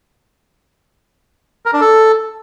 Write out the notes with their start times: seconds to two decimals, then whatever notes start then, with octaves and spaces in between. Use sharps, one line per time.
1.66 A#4
1.73 D4
1.81 A4